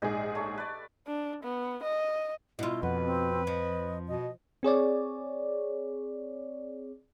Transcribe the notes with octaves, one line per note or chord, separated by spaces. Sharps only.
A#1 G#2 D#4 G4 G#4 G#5
A3 C#5
B4 D5
D4
B3
D#5
B2 E4 F4
F2 B4 F#5
C4
F3 D#5
B2 D#5
C4 G#4 C#5 D5